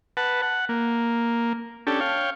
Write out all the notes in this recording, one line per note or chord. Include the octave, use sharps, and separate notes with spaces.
B4 F#5 A5
F#5
A#3
C#4 D4 G4 A4
C#5 F5 G5